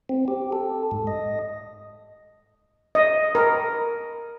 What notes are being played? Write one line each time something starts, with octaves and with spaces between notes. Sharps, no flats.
C4
G4
A4
G#2
D#5
D#5
A#4